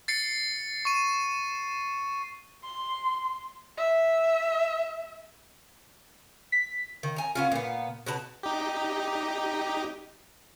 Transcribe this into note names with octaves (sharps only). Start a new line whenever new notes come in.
A6 C7 C#7
C#6 D#7
C6
E5
B6
D#3
G#5 A#5
B3 C#4 F4
A#2 B3
B2 B3 A5
D#4 G4